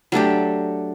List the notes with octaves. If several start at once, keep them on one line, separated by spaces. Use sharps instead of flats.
F#3 A3 D4 G4